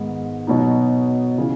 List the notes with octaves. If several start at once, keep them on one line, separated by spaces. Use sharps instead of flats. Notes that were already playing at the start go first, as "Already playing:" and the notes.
Already playing: G#2 D#3 G#3 B3
B2 F#3 B3 D#4
C#3 E3